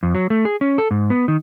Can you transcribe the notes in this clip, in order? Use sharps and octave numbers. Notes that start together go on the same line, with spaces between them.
F2
F#3
A3
G#4
C#4
A4
G#2
B3
D#3